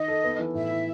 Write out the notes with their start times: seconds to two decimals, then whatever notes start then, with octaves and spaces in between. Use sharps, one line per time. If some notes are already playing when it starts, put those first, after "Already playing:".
Already playing: D#3 D#5
0.08 A4
0.24 B3
0.39 E3
0.55 A2 E5
0.70 E4